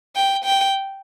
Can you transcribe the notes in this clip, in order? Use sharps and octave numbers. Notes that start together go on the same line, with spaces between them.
G5
G5